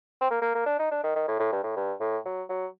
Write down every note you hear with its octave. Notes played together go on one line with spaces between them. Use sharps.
C4
A#3
A#3
A#3
D4
D#4
D4
D#3
D#3
A2
A2
G2
A2
G2
A2
F#3
F#3